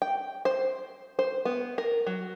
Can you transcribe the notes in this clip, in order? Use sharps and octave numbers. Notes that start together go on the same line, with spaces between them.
G5
C5
C5
B3
A#4
F#3